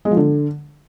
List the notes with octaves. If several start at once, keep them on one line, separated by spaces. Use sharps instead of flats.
G#3
F3
D3